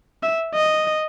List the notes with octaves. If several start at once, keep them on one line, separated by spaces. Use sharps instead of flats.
E5
D#5